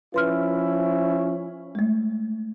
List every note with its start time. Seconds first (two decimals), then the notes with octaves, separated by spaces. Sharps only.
0.14 F3 C#4 E4 B4 C6 F6
1.75 G#3 A3